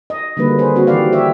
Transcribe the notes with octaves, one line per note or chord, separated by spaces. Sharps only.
D#5
D3 D#3 F#3 G3 A#3 B4
G#4 B4 C5
A#3 C4 F#4
D#3 E3 F#3 G4 D5 F5
G4 C#5 E5